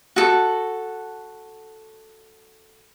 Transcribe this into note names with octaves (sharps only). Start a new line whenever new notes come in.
F#4 A4